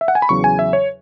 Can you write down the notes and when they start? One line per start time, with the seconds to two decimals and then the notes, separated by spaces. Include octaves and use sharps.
0.01 E5
0.08 F#5
0.15 G#5
0.22 B5
0.29 E2 C#3 F#3 C#6
0.44 G#5
0.59 E5
0.73 C#5